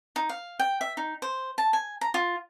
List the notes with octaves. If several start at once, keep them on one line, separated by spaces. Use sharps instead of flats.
D#4
F5
G5
E5
D#4
C5
A5
G#5
A#5
F4